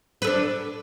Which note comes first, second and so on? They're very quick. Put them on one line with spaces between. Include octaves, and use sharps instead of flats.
B4 A4 D4